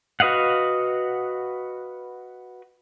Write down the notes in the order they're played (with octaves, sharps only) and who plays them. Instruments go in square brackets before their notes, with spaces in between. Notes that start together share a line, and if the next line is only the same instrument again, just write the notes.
[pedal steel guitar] F#4 B4 D#5 F5 F#5